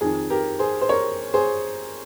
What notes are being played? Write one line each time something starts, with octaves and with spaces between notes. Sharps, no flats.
F2 D#3 G#4
G4 A#4
G#4 C5
C5
A#4 C#5
G#4 C5